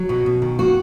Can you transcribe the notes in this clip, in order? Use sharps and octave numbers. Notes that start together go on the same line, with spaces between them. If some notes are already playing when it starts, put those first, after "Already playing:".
Already playing: F#3
B2 F#4
B2
D#3
A#3 F#4